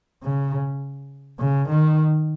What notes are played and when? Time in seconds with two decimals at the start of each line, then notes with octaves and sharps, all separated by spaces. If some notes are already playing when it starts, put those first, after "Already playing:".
0.23 C#3
1.39 C#3
1.69 D#3